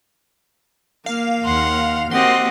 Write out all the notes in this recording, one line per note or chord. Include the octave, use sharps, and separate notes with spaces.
A#3 F5
D#2 F#5 C6
A#3 C4 F#4 G4 D#5 F#5 C6